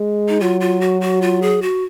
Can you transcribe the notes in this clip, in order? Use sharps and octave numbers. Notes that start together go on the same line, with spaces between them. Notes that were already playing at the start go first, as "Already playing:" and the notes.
Already playing: G#3
D#4
F#3 F4
F4
F#4
F#4
F4
G#4
F#4